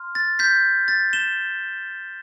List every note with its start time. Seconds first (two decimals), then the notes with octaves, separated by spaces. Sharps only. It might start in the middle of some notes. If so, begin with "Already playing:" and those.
Already playing: C6 F6
0.15 A6
0.39 G6 B6
0.88 A6
1.13 E7 G7